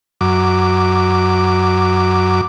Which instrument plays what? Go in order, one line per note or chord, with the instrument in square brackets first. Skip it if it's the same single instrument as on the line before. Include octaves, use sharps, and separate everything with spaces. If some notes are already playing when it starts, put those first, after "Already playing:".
[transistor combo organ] F#2 D6